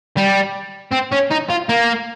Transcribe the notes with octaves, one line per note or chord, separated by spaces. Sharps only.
G3
C4
C#4
D#4
F4
A#3